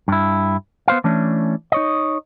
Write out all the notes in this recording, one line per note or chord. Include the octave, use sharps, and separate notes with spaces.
G2 E4
B3 C5 F5
E3 A3 C#4 D4
D#4 C#5 D#5